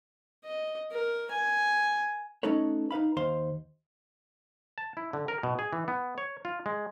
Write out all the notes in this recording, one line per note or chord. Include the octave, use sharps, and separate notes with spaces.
D#5
A#4
G#5
A3 C#4 D#4 A4 B4 C#5
D#4 B4 F5 B5
D#2 C5 F5 C6
A5
E4
D3
A#4
B2
G#4
E3
B3
C#5
F4
G#3